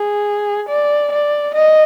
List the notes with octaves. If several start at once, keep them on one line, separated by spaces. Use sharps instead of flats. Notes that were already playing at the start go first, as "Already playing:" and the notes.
Already playing: G#4
D5
D5
D#5